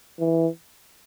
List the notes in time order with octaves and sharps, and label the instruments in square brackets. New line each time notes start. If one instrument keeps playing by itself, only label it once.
[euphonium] E3